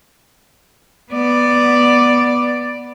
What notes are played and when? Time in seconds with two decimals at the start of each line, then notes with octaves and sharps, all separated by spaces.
1.12 B3 D5